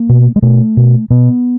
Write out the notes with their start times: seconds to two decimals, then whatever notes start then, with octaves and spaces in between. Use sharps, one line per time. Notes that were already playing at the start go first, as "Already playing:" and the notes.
Already playing: A#3
0.09 B2
0.36 G#3
0.42 B2 A3
0.77 B2
1.10 B2 B3